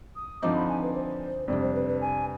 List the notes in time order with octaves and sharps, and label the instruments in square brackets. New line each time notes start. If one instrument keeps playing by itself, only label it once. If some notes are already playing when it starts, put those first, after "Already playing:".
[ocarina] D#6
[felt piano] D3 F3 C4 D#4 [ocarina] D6
[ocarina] B5
G#5
B4
C5
[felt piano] F2 C3 G3 D4 [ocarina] D5
[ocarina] C5
B4
B4
G#5